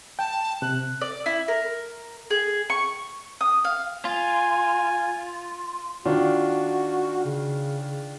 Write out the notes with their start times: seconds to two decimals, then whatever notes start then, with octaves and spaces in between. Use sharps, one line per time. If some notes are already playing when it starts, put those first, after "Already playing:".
0.19 G5 A5
0.62 C3 F#6
1.01 D5
1.26 E4
1.48 A#4
2.30 G#4
2.70 C#6
3.41 D#6
3.64 F5
4.05 F4 G#5
6.06 D#3 D4 F4 F#4
7.25 C#3